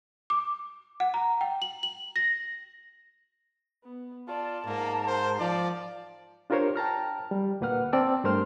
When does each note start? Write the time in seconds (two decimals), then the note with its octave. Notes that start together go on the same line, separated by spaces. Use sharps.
0.30 D6
1.00 F#5
1.14 A#5
1.41 G5
1.62 F#7
1.83 F#7
2.16 A#6
3.84 B3
4.28 F4 D5 A5
4.66 G#2 A#3 A#4
5.07 C5
5.40 F3 F4 D5
6.50 D4 F4 G4 A#4 C5 C#5
6.76 G5 A5 A#5 F6
7.31 G3
7.61 D2 A#2 A#3 B4 F#5 F6
7.93 C4 D5 G5 A5 E6
8.24 G2 A3 A#4 C5 C6 F6